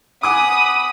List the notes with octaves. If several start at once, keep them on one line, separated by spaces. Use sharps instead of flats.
F#5 G#5 B5 D6 D#6